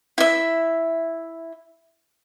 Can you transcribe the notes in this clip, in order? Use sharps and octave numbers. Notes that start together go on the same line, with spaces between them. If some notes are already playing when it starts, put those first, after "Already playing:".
E4 E5